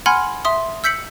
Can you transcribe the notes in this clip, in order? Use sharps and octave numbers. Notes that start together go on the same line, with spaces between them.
F#5 G#5 B5 C6 F6 G#6
E5 C6 D#6
E6 G6 B6 C#7 F#7